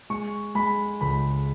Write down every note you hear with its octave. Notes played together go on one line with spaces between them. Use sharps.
G#3 C#6
G#3 B5
C#2 B5